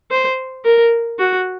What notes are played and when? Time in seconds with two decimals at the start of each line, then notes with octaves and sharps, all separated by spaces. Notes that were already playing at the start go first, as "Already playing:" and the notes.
0.11 C5
0.65 A#4
1.19 F#4